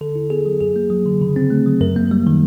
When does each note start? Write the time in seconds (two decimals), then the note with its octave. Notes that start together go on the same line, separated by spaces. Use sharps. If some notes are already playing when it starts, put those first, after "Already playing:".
0.01 D3 A4
0.15 E4
0.30 B3 G#4
0.46 F#3
0.61 F#2 G#4
0.76 A#3
0.90 F#3
1.06 D3
1.22 C#3
1.36 C4
1.50 A3
1.66 F#3
1.81 F#2 A#4
1.96 A#3
2.11 G3
2.27 D#3